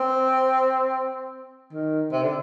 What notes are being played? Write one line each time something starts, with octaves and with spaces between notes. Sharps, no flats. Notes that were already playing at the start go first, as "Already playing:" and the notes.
Already playing: C4
D#3
C3
D3